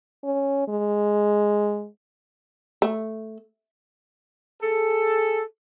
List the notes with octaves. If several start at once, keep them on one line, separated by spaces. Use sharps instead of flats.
C#4
G#3
A3
G#4 A4